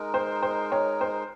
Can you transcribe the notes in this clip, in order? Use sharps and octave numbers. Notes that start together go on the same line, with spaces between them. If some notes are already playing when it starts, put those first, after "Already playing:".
Already playing: G#3 D#4 A#4
C5
C5
C#5
C5